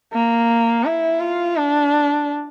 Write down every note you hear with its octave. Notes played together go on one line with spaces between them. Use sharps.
A#3
E4
F4
D4